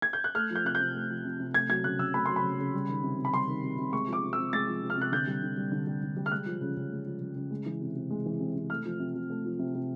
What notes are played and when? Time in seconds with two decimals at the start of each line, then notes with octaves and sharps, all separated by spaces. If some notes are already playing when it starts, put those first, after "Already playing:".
0.02 G#6
0.13 G6
0.24 F#6
0.35 A3 F6
0.50 F3 G6
0.65 C3 F#6
0.75 G6
0.80 C3
0.95 A3
1.10 F3
1.25 C3
1.40 C3
1.54 A3 G#6
1.69 F#3 G#6
1.84 C#3 F#6
1.99 C#3 E6
2.14 A3 B5
2.26 F#3 C6
2.36 B5
2.44 C#3
2.58 C#3
2.74 G3
2.89 D#3
3.03 C3
3.18 C3
3.25 B5
3.33 G3 C6
3.48 D#3
3.64 C3
3.78 C3
3.93 G#3 C#6
4.08 F3
4.13 D6
4.23 C3
4.33 C3 E6
4.53 G#3 A6
4.68 F3
4.83 C3
4.90 F6
4.97 C3 F#6
5.12 D3 G6
5.27 G3
5.42 D3
5.57 G3
5.72 D3
5.87 G3
6.02 D3
6.16 G3
6.26 F6
6.31 G#3 F#6
6.46 F3
6.61 C#3
6.77 C#3
6.92 G#3
7.06 F3
7.21 C#3
7.36 C#3
7.51 G#3
7.66 E3
7.81 C3
7.95 C3
8.10 G#3
8.25 E3
8.40 C3
8.56 C3
8.70 A3 F6
8.85 F3
9.00 C3
9.15 C3
9.30 A3
9.45 F3
9.59 C3
9.75 C3